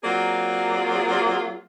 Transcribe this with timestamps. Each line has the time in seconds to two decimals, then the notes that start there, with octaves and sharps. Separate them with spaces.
0.03 F#3 A#3 C4 F4 G#4 D5